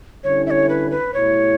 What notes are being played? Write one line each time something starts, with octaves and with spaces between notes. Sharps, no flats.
D3 G3 C#4 E4 A4 C#5
E5
C#5
B4
B4
B2 A3 E4 G4 C#5